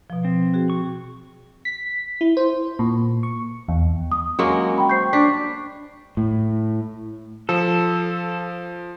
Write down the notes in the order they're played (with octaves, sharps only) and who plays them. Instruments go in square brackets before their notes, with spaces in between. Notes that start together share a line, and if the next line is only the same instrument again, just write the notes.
[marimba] B2 F3
[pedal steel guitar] C4
[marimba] F#4 G#4
[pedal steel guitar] C#6
[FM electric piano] B6
E4
C5
A#2
C#6
E2
[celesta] D#6
[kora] F#3 G#3 A#3 [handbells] C#4
[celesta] G5 B5
[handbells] C5 C#6 [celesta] G6 C7
[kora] D4 [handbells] C#6 C7 [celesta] B6
[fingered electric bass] A2
[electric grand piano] F3 [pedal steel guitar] A4